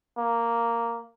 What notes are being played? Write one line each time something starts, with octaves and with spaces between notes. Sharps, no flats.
A#3